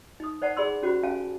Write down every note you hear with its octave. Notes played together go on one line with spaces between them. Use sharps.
D#4 D#6
C5 D5 F#5 A5
G#4 D5 B5 C6 E6
C#4 F#4 G4 C5 B5
C#4 F5 G#5 A5